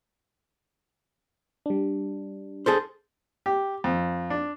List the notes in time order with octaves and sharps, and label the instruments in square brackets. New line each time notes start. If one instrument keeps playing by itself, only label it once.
[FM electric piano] G3 D4
[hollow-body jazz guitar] G#4 A4 C5
[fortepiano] G4
F2
D4